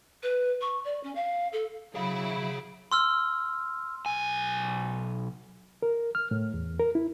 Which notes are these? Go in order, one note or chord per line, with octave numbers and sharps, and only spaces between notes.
B4
C#6
D5
C#4
F5
A4
F#3 E4 G#4 F5
C6 E6 F6
B1 G#5
A#4
F6
A2
E2
A#4
E4